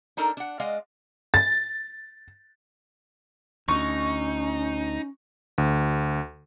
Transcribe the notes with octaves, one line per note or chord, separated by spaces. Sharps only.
D4 D#4 A4 A#4
D4 F#5
G#3 D5 D#5 F5 F#5
A6
D2 C#4 D#4 C#6
D2